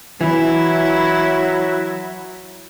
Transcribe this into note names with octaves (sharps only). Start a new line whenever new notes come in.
E3 F#3 E4